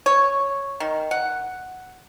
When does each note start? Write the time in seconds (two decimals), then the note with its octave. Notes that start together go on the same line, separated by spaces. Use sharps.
0.06 C#5
0.80 D#3
1.11 F#5